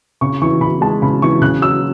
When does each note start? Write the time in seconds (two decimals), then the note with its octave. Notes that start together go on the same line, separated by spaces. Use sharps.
0.21 C#3 C#6
0.42 E3 C#6
0.61 C#3 B5
0.81 G#3 A5
1.02 C#3 B5
1.22 E3 C#6
1.41 C#3 F#6
1.62 F#3 E6